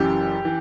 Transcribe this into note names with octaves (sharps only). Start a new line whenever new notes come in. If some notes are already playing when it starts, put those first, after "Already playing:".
Already playing: F#1 F#2 E3 G4
E3